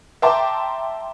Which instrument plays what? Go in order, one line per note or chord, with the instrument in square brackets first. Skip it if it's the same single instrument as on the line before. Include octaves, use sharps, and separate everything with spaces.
[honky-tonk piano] E5 G5 A5 A#5 C6 D6